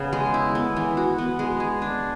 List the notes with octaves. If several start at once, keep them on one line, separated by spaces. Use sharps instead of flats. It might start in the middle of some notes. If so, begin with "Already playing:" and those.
Already playing: C#3 B3
G#3
E4
B3
E3
F#4
B3
G#3
G#4
D4